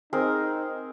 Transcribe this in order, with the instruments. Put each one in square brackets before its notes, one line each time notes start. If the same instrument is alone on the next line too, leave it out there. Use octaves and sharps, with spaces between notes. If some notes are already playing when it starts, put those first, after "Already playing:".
[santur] C4 G#4 A#4 [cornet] D#4